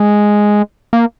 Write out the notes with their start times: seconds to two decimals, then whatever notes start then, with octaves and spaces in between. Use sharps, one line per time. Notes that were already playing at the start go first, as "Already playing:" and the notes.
Already playing: G#3
0.93 A#3